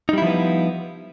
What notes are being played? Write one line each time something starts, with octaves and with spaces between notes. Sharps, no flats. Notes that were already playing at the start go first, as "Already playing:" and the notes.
F3 G3 B3 D#4 E4